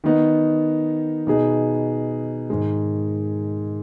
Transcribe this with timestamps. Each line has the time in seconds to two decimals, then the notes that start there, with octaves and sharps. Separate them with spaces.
0.04 D#3 B3 D#4
1.27 B2 B3 D#4 G#4
2.50 G#2 D#3 G#3